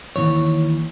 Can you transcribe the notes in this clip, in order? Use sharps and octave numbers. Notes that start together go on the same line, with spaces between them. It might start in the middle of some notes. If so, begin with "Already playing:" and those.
D#2 C#3 E3 C#5